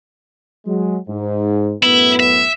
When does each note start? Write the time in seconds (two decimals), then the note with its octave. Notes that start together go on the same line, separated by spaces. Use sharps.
0.66 F#3 G#3
1.08 G#2
1.83 F#2 A2 B3 E4
2.20 E5